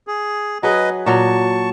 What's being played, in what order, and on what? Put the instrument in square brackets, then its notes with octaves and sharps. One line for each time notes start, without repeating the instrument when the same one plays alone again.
[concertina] G#4
[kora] F#3 G#4 [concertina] B4 D#5
[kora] A#2 F#3 [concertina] A5 C#6